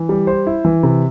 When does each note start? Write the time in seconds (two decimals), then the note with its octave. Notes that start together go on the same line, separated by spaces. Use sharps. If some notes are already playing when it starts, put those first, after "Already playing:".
Already playing: E3
0.09 G3
0.27 C5
0.47 E4
0.65 E3
0.83 C3